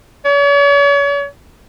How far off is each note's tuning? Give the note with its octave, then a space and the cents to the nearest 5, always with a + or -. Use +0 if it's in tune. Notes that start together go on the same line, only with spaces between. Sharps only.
C#5 +40